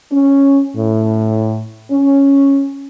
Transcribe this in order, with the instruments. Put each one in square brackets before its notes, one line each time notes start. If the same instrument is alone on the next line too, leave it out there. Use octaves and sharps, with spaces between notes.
[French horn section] C#4
A2
C#4